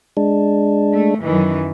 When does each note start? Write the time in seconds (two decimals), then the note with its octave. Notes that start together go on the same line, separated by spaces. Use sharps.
0.17 G#3 D4
0.93 A3
1.22 F#2 D#3 E3